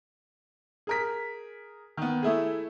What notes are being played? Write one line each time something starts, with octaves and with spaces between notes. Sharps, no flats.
G#4 A#4 B6
D#3 B3
A3 E4 G#4